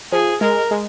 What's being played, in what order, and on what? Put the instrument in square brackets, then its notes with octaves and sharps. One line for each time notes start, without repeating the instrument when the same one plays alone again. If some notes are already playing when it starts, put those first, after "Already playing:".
[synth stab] F3 [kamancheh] G#4
[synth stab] G#3 [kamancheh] A#4
[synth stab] G#3